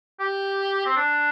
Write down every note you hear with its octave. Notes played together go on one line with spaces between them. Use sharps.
G4
C4
D4